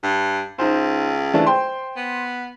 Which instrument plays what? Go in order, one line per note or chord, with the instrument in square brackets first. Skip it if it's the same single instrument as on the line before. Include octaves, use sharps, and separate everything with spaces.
[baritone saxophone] G2
[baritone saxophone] C#2 [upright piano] D#4 C5
[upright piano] E3 A3 D4
C5 G5 C6
[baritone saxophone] B3